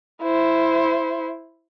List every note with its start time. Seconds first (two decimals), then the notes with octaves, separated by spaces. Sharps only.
0.23 E4 C5